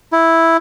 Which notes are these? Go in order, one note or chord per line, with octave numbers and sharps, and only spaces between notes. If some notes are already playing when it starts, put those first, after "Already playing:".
E4